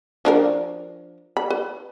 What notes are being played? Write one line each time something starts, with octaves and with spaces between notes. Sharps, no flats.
F3 D4 A#4
B5
B4